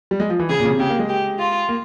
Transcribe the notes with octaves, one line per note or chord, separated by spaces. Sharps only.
G3
G#3
F3
E3
C#3 G#4
A#2
C#3
C3
C#3 G4
A#3
G#3
G4
F4
A#3